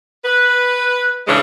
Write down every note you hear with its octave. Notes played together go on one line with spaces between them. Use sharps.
B4
A2 C#3 E3 G#3 D4